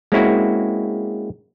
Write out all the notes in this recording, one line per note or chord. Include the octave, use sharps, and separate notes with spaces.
G#3 A#3 C4 C#4 E4 F#4